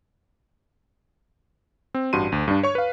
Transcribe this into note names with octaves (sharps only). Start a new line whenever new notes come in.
C4
A1 G2 F#4 A5 C6 D#7
D2
G2 D4
C#5 C#6
B4 F5